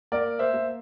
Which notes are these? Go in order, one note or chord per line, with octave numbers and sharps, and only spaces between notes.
A#3 A#4 D5
C5 E5
A#3